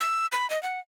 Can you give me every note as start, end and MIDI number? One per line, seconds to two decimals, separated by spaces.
0.01 0.26 88
0.32 0.49 83
0.50 0.61 75
0.63 0.80 78